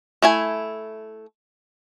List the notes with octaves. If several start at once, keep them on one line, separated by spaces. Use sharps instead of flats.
A3 E4 G#5